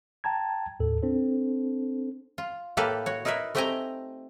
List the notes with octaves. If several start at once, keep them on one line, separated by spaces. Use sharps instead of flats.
G5 A5 A#5 G#6
D#2 A2 A4
C4 D4 A4 C5
F4
A2 A#3 G4 A4 B4 F5
F#4 C#5
D#4 E4 A#4 B4 E5
A3 C4 G4 G5 G#5 A#5